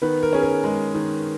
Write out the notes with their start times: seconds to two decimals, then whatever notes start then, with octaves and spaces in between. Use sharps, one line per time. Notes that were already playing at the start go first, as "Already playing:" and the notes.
0.02 D#3 B3 B4
0.23 A#4
0.33 C#4 G#4
0.43 A#4
0.64 G#3
0.95 D#3